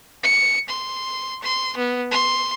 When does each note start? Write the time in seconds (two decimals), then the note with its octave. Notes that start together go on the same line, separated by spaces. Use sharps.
0.23 C#7
0.69 C6
1.43 C6
1.77 B3
2.11 C6